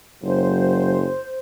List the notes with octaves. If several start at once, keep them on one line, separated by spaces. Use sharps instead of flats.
F#1 F#3 C5